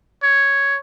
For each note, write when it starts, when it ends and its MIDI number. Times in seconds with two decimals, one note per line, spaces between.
0.23 0.78 73